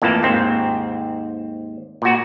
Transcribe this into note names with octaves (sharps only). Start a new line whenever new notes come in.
F2 A2 E3 A#3 A5
D#2 G#2 C4
A#2 F#4